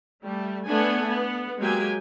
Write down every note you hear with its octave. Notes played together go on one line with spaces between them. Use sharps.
G3 A3
A3 B3 D4 G#5
B3
F#3 G#3 A#3 G4 G5 G#5